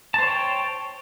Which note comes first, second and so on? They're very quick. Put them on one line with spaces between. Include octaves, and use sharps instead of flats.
A5 C5 C#5 G5